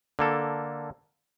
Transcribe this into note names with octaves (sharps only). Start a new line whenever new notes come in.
D3 A#3 A4